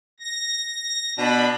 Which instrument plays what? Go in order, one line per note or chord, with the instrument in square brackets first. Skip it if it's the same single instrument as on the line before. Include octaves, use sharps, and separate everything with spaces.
[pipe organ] A#6
[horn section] B2 D4 [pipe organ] B5